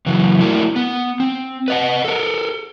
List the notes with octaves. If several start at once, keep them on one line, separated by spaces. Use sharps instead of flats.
C#3 E3 F#3
A3 D4 E4 F#4 A#4
B3
C4
B4 D#5 F#5
A4 A#4